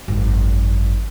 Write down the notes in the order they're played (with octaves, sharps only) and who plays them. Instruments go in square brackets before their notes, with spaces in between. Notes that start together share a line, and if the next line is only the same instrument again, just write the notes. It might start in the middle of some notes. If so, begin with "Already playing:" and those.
[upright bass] G#1 F#2